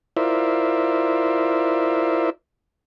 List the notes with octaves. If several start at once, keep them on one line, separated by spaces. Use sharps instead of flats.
E4 F4 A#4 C5 D5 E5